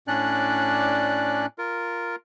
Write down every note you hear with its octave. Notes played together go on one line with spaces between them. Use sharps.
A2 C#4 D4 D5 F#6
F4 A#4